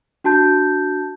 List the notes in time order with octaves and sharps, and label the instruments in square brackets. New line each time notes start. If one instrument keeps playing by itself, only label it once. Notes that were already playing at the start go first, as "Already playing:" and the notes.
[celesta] D4 F#4 A5 G6